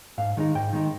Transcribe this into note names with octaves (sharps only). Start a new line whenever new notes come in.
G#2 F5
D#3 G#3 D#4
G#2 G5
D#3 G#3 D#4